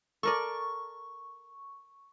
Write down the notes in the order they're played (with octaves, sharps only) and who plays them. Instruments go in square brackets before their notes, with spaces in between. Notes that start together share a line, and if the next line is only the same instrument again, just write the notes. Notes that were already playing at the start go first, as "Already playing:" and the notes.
[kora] A4 A#4 D5 [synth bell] C#6